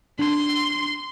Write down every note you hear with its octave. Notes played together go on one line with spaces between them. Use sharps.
D4 C6